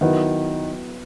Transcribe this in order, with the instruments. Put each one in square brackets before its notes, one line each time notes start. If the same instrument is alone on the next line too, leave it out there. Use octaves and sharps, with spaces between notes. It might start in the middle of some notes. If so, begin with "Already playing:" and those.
[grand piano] D#3 [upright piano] F#3 B3 E4